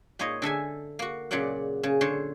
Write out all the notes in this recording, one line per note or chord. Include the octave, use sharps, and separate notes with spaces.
A#2 A#3 D#4 C#5 D#5
D3 A4 E5 G#5
A#3 F#4
A#2 C#3 F#3 D5 F#5
C#3
D3 C5 C#5